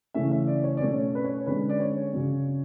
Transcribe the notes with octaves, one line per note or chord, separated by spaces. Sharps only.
C#3 E3 A3 C#4 E5
E5
D5
C#5
D5
B2 F#3 A3 C#4 C#5
B4
C#5
D3 G#3 C#4 B4
D5
C#5
C#3 F#3 C#4